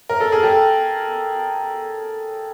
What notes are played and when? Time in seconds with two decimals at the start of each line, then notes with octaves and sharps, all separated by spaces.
0.09 A#4
0.20 A4
0.32 G#4
0.43 G4 A4